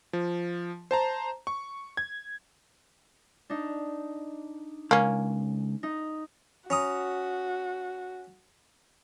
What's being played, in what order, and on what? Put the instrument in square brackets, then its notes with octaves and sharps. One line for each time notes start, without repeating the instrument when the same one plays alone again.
[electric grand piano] F3
C5 A5 A#5
C#6
G#6
[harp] D4 D#4
[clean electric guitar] C#2 [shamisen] A#3 C#4
[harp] D#4
[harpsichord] C#4 A#5 D#6 [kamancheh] F#4